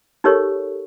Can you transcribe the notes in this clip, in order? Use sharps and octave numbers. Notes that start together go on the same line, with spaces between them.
D#4 G4 A4 A#4 C#5 C#6